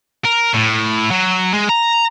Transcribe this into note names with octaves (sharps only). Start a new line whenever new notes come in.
A#4
A2
F#3
G#3
A#5